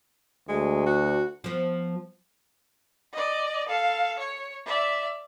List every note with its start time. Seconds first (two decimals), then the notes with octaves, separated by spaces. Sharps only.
0.49 D2 G#3
0.86 F#4
1.44 F3 B3
3.13 D5 D#5
3.69 A4 F5
4.19 C#5
4.66 D5 E5